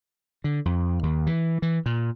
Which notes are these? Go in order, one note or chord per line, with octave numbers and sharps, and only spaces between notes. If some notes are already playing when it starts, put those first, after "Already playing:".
D3
F2
D#2
E3
E3
A#2